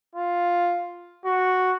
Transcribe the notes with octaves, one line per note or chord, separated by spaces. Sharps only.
F4
F#4